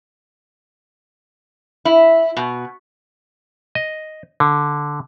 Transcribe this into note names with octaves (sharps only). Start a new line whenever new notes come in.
E4
B2
D#5
D3